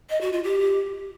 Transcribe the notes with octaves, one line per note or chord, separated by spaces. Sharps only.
D#5
F#4
F4
G4